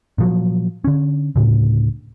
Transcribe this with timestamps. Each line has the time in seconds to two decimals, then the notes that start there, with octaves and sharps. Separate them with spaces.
0.18 A#2 F3 F#3
0.84 D3 C#4
1.36 D2 A2 C#3